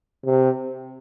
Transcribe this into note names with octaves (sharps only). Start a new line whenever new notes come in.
C3